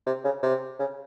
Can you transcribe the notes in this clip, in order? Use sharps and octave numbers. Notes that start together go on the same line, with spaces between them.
C3
C#3
C3
C#3